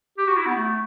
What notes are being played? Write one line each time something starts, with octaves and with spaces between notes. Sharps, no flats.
G4
F#4
E4
B3
A3